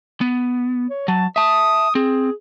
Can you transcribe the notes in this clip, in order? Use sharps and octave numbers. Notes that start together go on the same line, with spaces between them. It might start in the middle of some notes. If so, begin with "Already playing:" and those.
B3
C#5
F#3 A5
E5 A5 D#6
C4 G#4